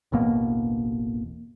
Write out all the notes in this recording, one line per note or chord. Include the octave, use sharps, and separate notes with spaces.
E1 A1 B2 A#3